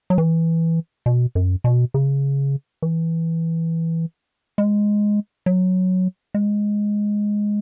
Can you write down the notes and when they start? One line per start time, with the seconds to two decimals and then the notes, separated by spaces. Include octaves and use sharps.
0.10 F#3
0.18 E3
1.06 B2
1.35 F#2
1.64 B2
1.94 C#3
2.82 E3
4.58 G#3
5.46 F#3
6.34 G#3